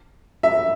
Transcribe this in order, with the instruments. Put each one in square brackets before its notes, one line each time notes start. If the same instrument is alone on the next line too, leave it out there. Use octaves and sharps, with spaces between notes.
[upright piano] E5